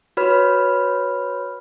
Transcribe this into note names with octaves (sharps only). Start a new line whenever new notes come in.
F#4 B4 C#5 B5 F6